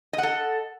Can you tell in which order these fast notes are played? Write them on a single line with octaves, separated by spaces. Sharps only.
D#5 F#5 A4